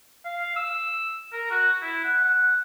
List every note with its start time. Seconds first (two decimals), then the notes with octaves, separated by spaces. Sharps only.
0.25 F5
0.56 E6
1.32 A#4
1.50 F#4
1.82 E4
2.04 F#5
2.24 F#5